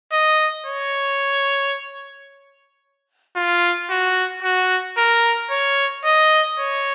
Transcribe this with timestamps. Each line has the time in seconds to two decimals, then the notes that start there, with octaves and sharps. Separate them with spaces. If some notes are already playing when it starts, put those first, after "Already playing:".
0.12 D#5
0.66 C#5
3.36 F4
3.90 F#4
4.43 F#4
4.97 A#4
5.50 C#5
6.05 D#5
6.58 C#5